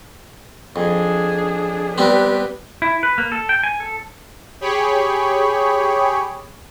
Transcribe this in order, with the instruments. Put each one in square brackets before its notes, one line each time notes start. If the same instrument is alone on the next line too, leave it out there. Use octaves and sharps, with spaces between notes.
[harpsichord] F2 [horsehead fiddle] D4 G#4
[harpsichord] G3 B3 C4 [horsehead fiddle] G4 B4
[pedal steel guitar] E4
B4
A#3
A4
G5
G#5
A4
[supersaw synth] G4 G#4 C#5 G5 B5